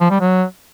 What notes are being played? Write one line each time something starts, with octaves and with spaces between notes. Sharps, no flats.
F3
G3
F#3